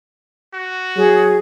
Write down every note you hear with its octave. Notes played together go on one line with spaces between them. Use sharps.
F#4
F#3 G#4